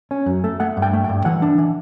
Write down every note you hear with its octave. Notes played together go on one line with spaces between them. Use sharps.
C#4
F#2
A3
A3 F#5
G2
G5
A3
G5
G2
E3 F#5
D4
E3